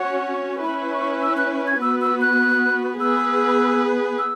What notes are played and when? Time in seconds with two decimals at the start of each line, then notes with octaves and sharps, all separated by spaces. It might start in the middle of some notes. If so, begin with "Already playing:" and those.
Already playing: C#4 F#4 C#5 F#5
0.63 C#4 E4 B4 B5
0.93 C#6
1.22 E6
1.37 F#6
1.67 G#6
1.82 B3 F#4 B4 E6
2.01 E6
2.21 F#6
3.00 B3 G#4 B4 E6
4.18 E6